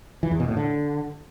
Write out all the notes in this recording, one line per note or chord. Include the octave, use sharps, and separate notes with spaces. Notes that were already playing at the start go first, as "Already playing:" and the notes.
E3
E2
B2
A2
D3